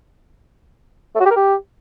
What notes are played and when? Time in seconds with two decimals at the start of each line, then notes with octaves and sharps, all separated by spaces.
1.15 A3
1.21 F#4
1.26 G4
1.31 A#4
1.36 G4